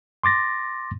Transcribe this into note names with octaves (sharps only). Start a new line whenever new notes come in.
C6 D6 A6 A#6